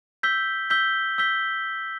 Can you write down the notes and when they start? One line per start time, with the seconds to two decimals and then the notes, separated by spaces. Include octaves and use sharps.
0.23 E6 G6 B6 G7
0.70 E6 G6 B6 G7
1.18 E6 G6 B6 G7